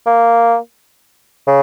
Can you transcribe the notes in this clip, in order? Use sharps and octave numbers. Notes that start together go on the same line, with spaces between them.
A#3
C#3